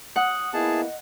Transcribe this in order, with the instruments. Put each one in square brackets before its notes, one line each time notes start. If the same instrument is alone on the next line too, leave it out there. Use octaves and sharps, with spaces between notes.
[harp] F#5 [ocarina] D#6
[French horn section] A#3 B3 E4 [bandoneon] G#4 A5 [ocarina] D#5